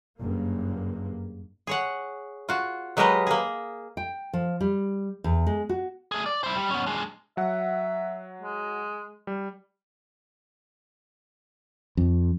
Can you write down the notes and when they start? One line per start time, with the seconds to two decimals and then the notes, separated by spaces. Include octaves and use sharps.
0.18 F#1 G2 A#3
1.67 G#4 C#5 F#5
2.49 F4 F#4
2.97 F#3 G#3 G4 A#4 B4 D#5
3.27 A#3 G#4
3.97 G5
4.33 F3
4.61 G3
5.24 E2
5.47 G#3
5.69 F#4
6.12 A3 G#4
6.26 D5
6.44 E4 C5
6.56 G3
6.71 B3 C#4
6.86 G#3 D4
7.37 F#3 E5 F#5
8.42 G#3
9.27 G3
11.97 F2